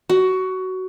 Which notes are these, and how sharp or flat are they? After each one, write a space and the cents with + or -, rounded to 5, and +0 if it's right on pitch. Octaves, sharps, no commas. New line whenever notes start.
F#4 +15